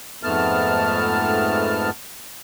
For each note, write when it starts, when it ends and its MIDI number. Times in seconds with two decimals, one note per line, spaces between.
0.23 1.90 41
0.23 1.90 44
0.23 1.90 57
0.23 1.90 59
0.23 1.90 81
0.23 1.90 89